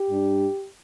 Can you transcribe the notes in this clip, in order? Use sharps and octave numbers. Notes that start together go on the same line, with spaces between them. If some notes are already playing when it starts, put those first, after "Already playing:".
Already playing: G4
G2 G3 D4